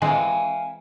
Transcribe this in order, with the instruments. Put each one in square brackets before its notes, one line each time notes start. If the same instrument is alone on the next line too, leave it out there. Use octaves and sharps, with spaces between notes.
[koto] E3 G#3 C4 [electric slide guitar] E5 F5 G#5